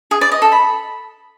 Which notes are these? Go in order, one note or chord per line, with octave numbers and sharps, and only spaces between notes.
G#4
D5
D#5
A4
B5